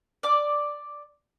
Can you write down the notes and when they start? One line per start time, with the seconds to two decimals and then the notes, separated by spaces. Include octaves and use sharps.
0.23 D5 D6